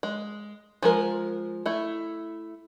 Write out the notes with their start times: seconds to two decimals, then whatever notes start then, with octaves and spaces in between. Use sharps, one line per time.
0.03 G#3
0.82 F3 G#3 A#4
1.66 A3 E4